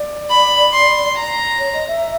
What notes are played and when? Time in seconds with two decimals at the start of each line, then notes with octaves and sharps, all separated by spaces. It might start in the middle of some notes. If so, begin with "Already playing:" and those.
Already playing: D5
0.30 B5
0.73 C6
1.16 A#5
1.59 C#5
1.73 D#5
1.88 E5